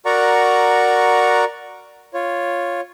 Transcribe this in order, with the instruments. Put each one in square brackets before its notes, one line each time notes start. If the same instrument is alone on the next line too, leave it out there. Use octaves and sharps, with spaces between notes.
[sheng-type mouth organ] F#4 A#4 D5 F#5 A#5 C#6
F4 C#5